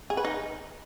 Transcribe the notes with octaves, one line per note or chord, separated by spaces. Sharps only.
G#4
B4
D#4